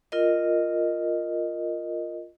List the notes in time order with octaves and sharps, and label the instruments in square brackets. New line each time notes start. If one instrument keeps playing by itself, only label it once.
[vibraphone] F4 A#4 D#5